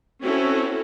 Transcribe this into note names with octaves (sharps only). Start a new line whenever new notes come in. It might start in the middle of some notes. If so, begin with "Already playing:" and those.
C4 C#4 E4 F#4 A4